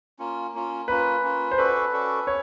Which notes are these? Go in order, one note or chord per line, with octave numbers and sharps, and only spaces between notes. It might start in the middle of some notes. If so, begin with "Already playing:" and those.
A#3 C#4 F4
A#3 C#4 F4
A#3 C#4 F4 B4
A#3 C#4 F4
C5
C#4 F#4 A4 B4 D5
C#4 F#4 A4 D5
C#4 C#5